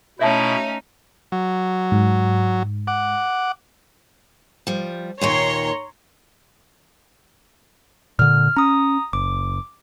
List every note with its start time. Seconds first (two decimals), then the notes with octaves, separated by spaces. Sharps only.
0.19 B2 A3 C#4 D#4 E4 C#5 E5 A5
1.32 F#3
1.92 G#2
2.87 F#5 D6
4.67 F3 G3
5.21 D#2 A#2 D#3 C#5 A#5 C6
8.19 A#2 D3 F6
8.57 C#4 A#5 D#6
9.13 F#1 D6